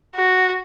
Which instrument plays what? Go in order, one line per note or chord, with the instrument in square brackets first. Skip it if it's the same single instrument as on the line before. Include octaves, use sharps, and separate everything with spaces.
[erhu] F#4